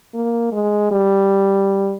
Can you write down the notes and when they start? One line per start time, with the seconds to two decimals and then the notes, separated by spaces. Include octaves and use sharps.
0.14 A#3
0.52 G#3
0.91 G3